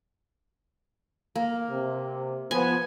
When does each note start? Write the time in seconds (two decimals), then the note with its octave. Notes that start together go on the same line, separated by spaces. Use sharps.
1.35 A#3
1.69 C3
2.51 F3 B3 G#5